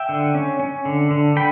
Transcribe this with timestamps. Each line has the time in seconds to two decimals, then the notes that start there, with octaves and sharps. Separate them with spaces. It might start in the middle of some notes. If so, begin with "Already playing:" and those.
Already playing: E5 G5
0.09 D3
0.35 C#4
0.59 C#4
0.85 D3
1.11 D3
1.36 D3 G5 B5